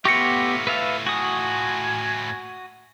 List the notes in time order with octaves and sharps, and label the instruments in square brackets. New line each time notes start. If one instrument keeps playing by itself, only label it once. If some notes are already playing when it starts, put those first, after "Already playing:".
[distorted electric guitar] A2 F4 [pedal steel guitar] B3 G4 [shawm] E5 [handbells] C#6 A#6 C#7
[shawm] A4 [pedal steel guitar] B4 E5 F5
[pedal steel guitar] F#4 D#6 [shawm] G#5